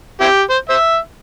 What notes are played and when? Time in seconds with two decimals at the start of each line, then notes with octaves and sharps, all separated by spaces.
0.21 C4 E4 G4
0.50 C5
0.69 C5 E5